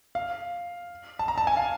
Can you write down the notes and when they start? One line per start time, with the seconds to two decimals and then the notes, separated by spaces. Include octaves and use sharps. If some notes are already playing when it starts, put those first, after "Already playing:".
0.15 F5
1.19 A5
1.28 A#5
1.38 A5
1.47 G#5
1.57 F5